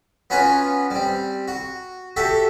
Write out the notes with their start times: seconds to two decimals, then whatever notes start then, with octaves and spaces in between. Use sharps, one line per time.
0.30 B3 C#4 F4 F#4 B4 G#5
0.91 G3 C4
1.48 F#4
2.16 F#4 G4 A4 E5